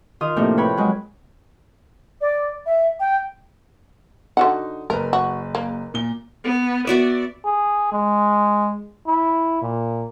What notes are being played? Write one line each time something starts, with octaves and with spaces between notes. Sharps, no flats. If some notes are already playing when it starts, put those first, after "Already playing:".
D#3 F4 F5 C6 D#6
A2 C3 F3 A3 A#3 D4
A#4 B4 C#5 G5 B5
F#3 G#3 F#5
D5
E5
G5
D3 D#4 F#4 F#5
F#1 A#4 B4
F#4
A#3
A#2 G7
B3
B3 F#4 D5 E5
G#4
G#3
E4
A#2